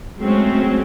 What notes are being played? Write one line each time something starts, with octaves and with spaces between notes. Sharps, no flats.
F#3 G#3 A3 C4 C#4